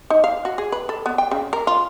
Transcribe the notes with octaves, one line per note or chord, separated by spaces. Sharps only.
D#4
F5
F#4
G#4
B4
A4
B3
G5
C#3
A#4
F4